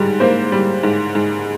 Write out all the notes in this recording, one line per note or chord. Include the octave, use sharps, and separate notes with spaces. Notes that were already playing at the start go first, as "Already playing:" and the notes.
Already playing: G#2 G3
A#3 C5
G3
G#2
G#2